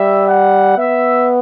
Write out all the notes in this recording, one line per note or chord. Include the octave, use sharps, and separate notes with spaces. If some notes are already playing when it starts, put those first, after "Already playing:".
Already playing: G3 E5
F#5
B3 E5